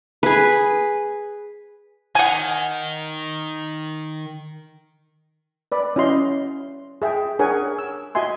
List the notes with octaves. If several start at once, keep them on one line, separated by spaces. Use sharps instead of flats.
G#4 B4
D#3 F#5 G#5
B4 D5 B5
C#4 E4 F#4 D#5 C6
G#4 E5 G5
D4 G#4 A#4 C#5 F#5 G#5
E6
F#4 D#5 E5 G#5 C6